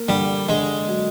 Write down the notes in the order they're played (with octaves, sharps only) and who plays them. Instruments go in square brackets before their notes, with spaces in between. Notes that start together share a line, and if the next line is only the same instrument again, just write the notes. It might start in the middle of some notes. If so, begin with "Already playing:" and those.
Already playing: [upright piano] A#3
[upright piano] D3 [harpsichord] G3
[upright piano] D3 [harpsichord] G#3
[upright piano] F#3